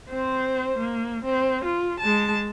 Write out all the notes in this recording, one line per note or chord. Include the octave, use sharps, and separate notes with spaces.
C4 C5
A#3
C4
F4
G#3 A5